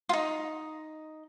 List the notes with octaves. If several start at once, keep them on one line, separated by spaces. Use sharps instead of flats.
D#4 F4